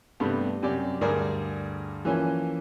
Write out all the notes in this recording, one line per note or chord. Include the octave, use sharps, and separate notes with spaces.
G2 C3 A3 B3 D4 G4
F#2 C3 G4 D5
D2 G2 G#4 A#4 D5
E3 F3 A#3 C#4 G#5